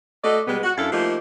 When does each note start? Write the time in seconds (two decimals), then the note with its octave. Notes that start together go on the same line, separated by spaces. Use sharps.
0.24 A3 F#4 A4 D5 D#5
0.48 B2 G3 G#3 B3
0.64 F#4
0.78 F#2 D4 E4 A4 F5
0.93 F3 A3 A#3 D#4 F4 G4